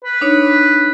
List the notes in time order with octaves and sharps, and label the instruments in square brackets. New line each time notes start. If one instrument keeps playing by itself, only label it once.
[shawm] B4
[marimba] D4 D#4 C#5